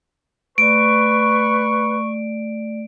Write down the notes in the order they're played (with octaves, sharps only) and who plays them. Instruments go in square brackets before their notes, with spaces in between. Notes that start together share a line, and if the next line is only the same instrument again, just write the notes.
[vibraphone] A3 D5 [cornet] B4 [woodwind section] C#6 [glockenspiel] D7